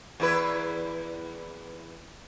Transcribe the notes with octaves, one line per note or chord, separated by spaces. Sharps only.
E2 E4 B4